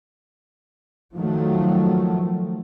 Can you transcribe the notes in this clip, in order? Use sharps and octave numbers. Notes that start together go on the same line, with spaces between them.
D#3 F3 F#3 A3